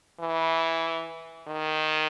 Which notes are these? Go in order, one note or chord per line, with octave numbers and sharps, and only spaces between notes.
E3
D#3